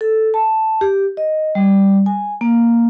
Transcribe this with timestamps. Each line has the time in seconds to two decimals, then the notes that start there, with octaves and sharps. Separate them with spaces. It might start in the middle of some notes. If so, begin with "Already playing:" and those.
0.01 A4
0.34 A5
0.81 G4
1.17 D#5
1.55 G3
2.06 G#5
2.41 A#3